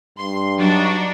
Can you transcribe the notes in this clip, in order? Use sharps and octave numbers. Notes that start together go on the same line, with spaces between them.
G2 C6
F#3 D4 D#4 F#4